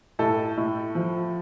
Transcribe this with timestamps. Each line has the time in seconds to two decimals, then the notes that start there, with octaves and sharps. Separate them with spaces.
0.19 A2 A4
0.57 A2
0.95 F3